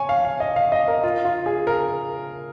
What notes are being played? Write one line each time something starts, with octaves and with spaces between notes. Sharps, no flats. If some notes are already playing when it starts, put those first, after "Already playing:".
Already playing: C#5 G#5
F5
F5
D#5
F5
D#5
A#4
F4
F4
G#4
A#4